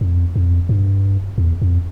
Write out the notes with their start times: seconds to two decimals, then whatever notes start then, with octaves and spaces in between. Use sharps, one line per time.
0.01 F2
0.36 F2
0.69 G2
1.38 E2
1.62 F2